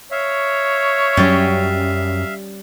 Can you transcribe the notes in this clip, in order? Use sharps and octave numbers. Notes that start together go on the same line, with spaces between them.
C#5 E5 F5
F#2 F#3 G3 C#4